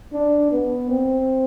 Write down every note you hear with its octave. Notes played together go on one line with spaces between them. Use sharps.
D4
B3
C4